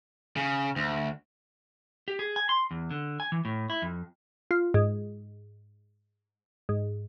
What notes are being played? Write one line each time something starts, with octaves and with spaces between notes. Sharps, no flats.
C#3
D2
G4
G#4
G#5
C6
E2
D3
G#5
E3
A2
E4
F2
F4
G#2
G#2